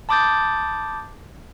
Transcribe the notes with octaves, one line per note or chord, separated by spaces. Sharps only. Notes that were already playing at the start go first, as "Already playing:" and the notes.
A5 B5 D6 D#6 G6 A6